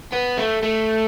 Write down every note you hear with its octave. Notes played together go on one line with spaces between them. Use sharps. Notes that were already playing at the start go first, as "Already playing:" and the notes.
B3
A3
A3